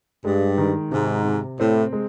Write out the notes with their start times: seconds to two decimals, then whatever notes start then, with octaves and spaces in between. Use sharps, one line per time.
0.25 G2 G#3
0.58 D#3
0.91 G#2 C3
1.25 C3
1.60 A2 C4
1.93 G#3